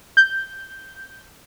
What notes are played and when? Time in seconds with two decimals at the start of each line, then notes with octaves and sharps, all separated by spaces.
0.17 G6